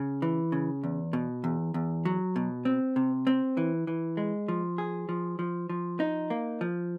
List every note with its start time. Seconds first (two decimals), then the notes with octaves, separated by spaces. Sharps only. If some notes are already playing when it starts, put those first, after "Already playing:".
Already playing: C#3
0.22 E3
0.52 C#3
0.84 E2
1.13 B2
1.44 E2
1.74 E2
2.05 F#3
2.36 B2
2.65 C4
2.96 C3
3.27 C4
3.57 E3
3.87 E3
4.17 G#3
4.48 F3
4.78 G#4
5.09 F3
5.39 F3
5.70 F3
6.00 D#4
6.30 A#3
6.61 F3